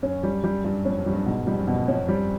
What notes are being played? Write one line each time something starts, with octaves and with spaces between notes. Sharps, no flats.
F#2 C#4
G3
G3
G2 G3
F2 C#4
F#2
G3
G2
G#2 B2
F2 G3
F#2
B2
F2 C#4
G3